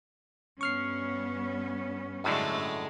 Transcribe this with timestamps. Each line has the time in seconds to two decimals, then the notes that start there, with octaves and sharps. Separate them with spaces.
0.61 G2 B3 C#4 C#6 F6 C7
2.24 F#2 A2 D3 G#3 A3